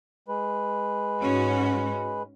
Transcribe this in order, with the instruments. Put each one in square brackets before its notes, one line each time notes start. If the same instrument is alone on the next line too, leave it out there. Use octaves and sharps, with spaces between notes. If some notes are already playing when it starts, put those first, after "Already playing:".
[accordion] G#3 B4
[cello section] G#2 C#4 F#4